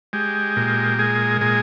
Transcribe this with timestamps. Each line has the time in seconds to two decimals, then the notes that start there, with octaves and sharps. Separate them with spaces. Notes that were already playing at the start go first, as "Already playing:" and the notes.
0.13 G#3 G4
0.56 A#2
0.99 G#3 G#4
1.41 A#2 G#4